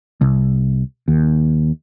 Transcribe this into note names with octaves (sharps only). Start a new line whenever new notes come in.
C2
D#2